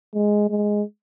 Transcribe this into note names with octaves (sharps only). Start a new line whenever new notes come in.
G#3
G#3